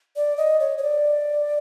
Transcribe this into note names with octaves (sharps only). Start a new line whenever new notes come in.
D5
D#5
C#5
C#5
D5